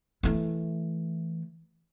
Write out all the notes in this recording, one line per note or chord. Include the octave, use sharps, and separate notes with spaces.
E3 A3